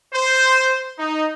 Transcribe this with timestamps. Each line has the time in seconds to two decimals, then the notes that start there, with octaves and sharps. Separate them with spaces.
0.13 C5
0.99 D#4